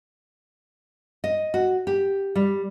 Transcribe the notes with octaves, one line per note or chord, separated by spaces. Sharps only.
D#5
F#4
G4
G3